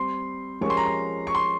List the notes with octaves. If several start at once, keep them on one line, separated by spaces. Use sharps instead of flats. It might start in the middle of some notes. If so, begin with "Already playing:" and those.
Already playing: G3 C4 C6
F3 G#3 C#4 G4 A#4 C#6
C6
A#5
C6
C#6
C6